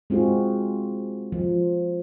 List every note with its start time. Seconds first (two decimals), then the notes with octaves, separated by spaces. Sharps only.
0.10 G#3 C4 F4 F#4 G#4
1.32 F3